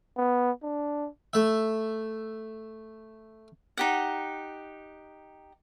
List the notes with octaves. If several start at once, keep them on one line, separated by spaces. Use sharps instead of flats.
B3
D4
A3 E5
D#4 G4 F#5